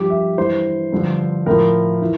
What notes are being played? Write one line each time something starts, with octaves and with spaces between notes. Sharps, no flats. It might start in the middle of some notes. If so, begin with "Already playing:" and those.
Already playing: G2 F3 G4
E5
G2 E3 C5
G2 D3 F3
A2 F3 A#4
E3